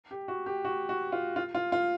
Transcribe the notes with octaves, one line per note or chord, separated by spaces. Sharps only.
G4
F#4
G4
F#4
F#4
F4
F4
F4
F4